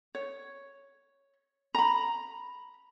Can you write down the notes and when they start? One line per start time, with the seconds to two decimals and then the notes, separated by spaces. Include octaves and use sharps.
0.15 C#5
1.75 A#5 B5